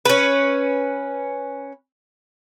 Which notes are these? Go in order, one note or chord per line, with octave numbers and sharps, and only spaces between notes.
C#4 B4